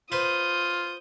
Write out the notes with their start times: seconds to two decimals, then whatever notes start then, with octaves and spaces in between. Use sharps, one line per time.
0.12 F4 B4 C5 D#6 G6